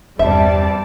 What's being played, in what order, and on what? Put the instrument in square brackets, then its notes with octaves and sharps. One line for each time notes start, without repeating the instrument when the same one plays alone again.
[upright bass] E2 [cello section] G2 C3 D5 [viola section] G3 A5 [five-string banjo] E5